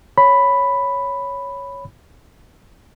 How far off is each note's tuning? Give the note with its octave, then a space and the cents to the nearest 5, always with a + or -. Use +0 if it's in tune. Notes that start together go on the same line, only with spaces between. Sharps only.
C#5 +0 B5 +5